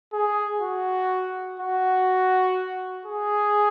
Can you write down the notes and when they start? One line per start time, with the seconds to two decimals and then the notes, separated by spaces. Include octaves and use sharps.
0.13 G#4
0.61 F#4
1.60 F#4
3.06 G#4